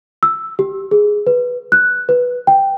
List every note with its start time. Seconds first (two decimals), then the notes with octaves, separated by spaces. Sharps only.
0.23 E6
0.59 G4
0.91 G#4
1.27 B4
1.72 F#6
2.09 B4
2.47 G5